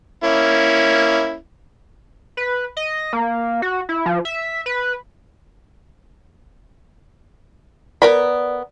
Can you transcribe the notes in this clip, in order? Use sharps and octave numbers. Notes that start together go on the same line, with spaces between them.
A#3 C#4 E4
B4
D#5
A#3
F#4
E4
F3
E5
B4
B3 A#4 D5 B5